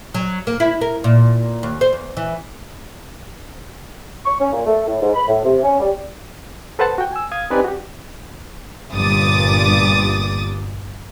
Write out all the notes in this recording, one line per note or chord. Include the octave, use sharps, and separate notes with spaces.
F#3
A#3
E4
A#4
A#2
D#2
C5
E2
E3
C#6
C#4
A#2
A3
A2
G#2
B5
A2
C3
C#4
G3
A4 B4 C5 F#5 A5
F#4 G5
G#5 E6
F5 D#6 G#6
C4 D#4 G4 B4 D5 G#5
F#4 G4
G1 G2 A#2 D6 D#6 A6